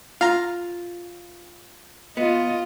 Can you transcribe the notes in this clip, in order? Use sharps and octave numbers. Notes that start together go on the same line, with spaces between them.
F4 F5 A#5
B3 F4 D#5